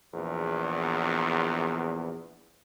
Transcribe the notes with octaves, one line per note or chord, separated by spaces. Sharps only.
A#1 E2